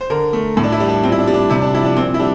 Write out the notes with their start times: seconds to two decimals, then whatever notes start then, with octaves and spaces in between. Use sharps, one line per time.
0.01 C5
0.10 D3 A#4
0.33 A3
0.57 A2
0.63 D4
0.72 E4
0.80 G3
0.88 D4
1.03 A#2 C4
1.12 E4
1.19 D4
1.27 G3
1.34 D4
1.49 C3 E4
1.62 D4
1.73 F3 E4
1.85 D4
1.96 A#2 C4
2.14 E4
2.19 G3 D4